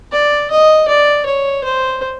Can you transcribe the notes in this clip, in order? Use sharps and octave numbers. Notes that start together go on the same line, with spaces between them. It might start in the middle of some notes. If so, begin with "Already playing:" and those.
D5
D#5
D5
C#5
C5